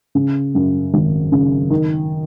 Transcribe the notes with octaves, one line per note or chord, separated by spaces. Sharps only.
C#3
F#2
G#1
C#3
D#3